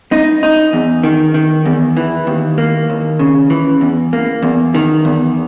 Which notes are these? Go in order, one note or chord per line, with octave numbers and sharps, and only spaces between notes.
D#4
D#4
E2
D#3
D#3
E2
E3
D#2
A#3
D#2
C#3
E3
E2
A#3
E2
D#3
E2